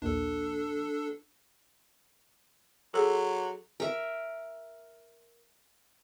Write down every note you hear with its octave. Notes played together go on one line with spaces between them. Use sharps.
A#1 D#2 D4 A4
F#3 G#4 A4
A#4 E5